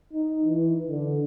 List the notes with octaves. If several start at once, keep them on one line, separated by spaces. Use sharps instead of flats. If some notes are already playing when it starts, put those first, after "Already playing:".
D#4
E3
D3